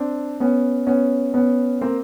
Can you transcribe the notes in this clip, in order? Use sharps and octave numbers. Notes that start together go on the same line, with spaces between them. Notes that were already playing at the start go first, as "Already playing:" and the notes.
Already playing: C4 D4
B3 C#4
B3 C#4
B3 C#4
A#3 C4